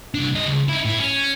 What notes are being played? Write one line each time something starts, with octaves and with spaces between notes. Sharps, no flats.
C2 D4
G3 D#5
C#2
D#4 E4
A2 E4
C#4